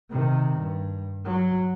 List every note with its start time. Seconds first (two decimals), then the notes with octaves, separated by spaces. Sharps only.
0.10 C3 D#3
0.59 G2
1.25 F#3